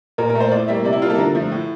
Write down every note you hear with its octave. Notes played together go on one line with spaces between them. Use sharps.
A#2 A#4
A#4
A3
C5
A2 D5
G3 A#3 E5
C3 D5
E4
G3 A#3 F4 A4
D3 A#4
F3 A3
A2